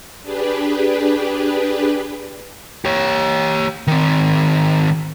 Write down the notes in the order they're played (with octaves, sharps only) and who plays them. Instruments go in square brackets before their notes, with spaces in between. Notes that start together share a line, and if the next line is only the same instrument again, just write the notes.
[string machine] D4 G4 G#4 B4
[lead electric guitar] G4 C#5
D#3 C4